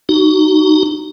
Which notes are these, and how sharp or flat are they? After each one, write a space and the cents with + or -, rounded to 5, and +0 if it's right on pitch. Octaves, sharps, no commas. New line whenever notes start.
D#4 -15 F#4 +25